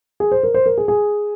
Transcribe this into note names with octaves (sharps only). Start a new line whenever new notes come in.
G#4
C5
A#4
C5
A#4
G#4
G#4